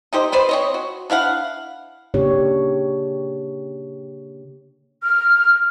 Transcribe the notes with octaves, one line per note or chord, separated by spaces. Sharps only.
D#4 G4 C5 D#5
B3 B4 C5 D5
C4 C#5 D#5
F#4
D4 E4 F5 F#5
C#3 A#3 D4 G4 C#5
F6